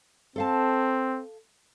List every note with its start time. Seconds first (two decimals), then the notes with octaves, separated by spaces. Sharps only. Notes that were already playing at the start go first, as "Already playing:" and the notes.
0.36 C4 A4 F5 A5